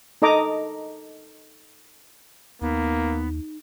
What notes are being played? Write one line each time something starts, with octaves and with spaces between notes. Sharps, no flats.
D#4 A4 D#5 A#5 D6
D#2 A#3 B3 D#4